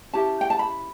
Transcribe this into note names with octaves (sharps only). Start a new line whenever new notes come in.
C#4 E4 G4 A5
G5
A5
B5